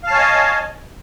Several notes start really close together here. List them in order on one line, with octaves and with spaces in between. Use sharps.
F5 A5 C#5 G#5 D#5